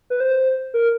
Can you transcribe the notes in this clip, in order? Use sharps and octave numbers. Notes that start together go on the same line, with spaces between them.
B4
C5
A#4